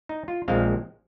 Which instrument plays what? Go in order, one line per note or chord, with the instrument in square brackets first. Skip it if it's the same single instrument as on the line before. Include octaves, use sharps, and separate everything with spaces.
[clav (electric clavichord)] D#4
F4
A#1 A#2 F3 G#3 C4 F5